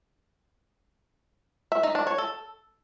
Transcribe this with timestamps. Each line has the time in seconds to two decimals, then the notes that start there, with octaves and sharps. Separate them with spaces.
1.72 E5
1.83 D#4
1.95 D4
2.07 C#5
2.18 A4